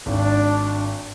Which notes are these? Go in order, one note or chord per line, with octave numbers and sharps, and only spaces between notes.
G#1 D4